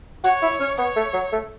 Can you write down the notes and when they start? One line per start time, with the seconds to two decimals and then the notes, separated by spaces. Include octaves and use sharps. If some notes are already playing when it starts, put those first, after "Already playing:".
0.24 F#4 C#5
0.43 E4
0.60 C#4
0.78 B3 C#5
0.96 A3
1.14 F#3
1.32 A3